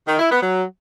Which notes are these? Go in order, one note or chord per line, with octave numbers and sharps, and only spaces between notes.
D#3
E4
B3
F#3